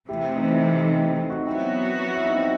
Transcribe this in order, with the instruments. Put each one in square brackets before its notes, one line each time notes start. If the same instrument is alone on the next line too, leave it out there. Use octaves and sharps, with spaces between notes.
[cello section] C3 E3 A3 [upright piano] E4 G4
[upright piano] D#4
C4 E4
D#4
C4
D#4
D#4 F#4
[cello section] F#3 B3 F#4 [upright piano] C4 E4
[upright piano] E4
D#4
C4